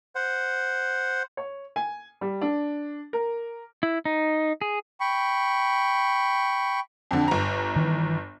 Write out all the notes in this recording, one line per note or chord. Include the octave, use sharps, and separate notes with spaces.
C5 F#5
C#5
G#5
G3
D4
A#4
E4
D#4
G#4
G5 B5 C#6
F2 D3
G1 A#5
D#3 E3